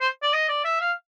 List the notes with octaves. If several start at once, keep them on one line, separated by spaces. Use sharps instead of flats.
C5
D5
D#5
D5
E5
F5